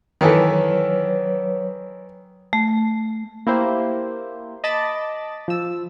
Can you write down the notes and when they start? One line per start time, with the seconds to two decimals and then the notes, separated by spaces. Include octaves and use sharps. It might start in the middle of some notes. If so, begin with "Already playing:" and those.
0.21 D#3 E3 F#3 A4 B4 C#5
2.53 A3
3.47 A#3 E4 G4 C5
4.64 D#5 A5 B5 D6 A6
5.48 F3 E6